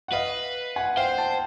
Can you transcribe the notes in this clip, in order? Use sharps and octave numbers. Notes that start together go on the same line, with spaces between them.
F#5
B4 D#5 F5
F#5 G#5
C5 F5 G5
G5 A5